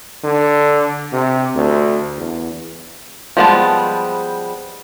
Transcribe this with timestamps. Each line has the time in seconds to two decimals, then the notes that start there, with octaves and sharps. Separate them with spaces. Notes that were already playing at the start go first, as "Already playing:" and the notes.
0.24 D3
1.13 C3
1.56 D2
2.18 E2
3.37 F3 G3 G#3 B3 A5